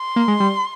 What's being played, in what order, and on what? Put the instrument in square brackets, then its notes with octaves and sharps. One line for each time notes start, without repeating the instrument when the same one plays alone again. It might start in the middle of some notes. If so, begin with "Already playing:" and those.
Already playing: [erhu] C6
[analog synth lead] A#3
G#3
G3